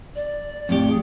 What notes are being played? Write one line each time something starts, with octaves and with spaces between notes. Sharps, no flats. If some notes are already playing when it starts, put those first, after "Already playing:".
D5
F2 A2 G4
G#4